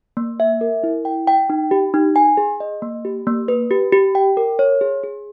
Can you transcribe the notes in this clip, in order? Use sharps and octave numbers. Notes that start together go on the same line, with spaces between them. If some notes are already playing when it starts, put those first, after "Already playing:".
A#3
E5
A#4
E4
G5
G5
D#4
G4
D#4
G#5
G#4
D#5
A#3
G4
A#3
B4
G4
G4
G5
A#4
C#5
G#4
G#4